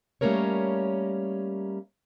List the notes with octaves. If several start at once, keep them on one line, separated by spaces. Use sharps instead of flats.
G3 A3 A#3 C#4 A#4 C#5